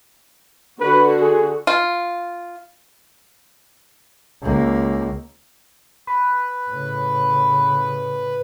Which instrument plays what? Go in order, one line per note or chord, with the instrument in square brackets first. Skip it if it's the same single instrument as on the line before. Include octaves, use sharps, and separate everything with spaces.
[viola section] D3 F#4 [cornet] B4
[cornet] G#4
[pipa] F4
[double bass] C#2 A#3
[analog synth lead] B4
[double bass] A2 C#3